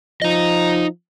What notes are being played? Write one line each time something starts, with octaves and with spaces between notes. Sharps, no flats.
F3 D#4 D#5